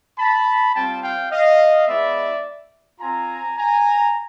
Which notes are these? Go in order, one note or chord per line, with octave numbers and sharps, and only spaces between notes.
A5 B5
G3 C4 F4 G5 A5
F5 G5
D#5 F5
G#3 B3 E4 D5 E5
C4 F4 G#5 A#5
G#5 A#5